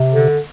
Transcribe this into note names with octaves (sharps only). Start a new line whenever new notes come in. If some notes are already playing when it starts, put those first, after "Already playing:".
Already playing: C3
D3